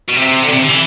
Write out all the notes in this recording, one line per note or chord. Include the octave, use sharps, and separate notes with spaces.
B2
C3
D3
C3
D3
E3